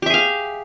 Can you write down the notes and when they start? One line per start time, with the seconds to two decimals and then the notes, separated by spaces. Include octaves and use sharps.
0.02 G4
0.06 E5
0.10 G#4
0.14 F5